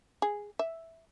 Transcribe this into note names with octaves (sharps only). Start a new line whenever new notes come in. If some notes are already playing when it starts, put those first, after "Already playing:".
G#4
E5